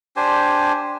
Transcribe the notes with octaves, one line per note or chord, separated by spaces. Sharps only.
D4 G4 C5 G#5